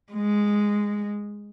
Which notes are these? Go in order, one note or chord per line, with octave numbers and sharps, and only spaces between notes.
G#3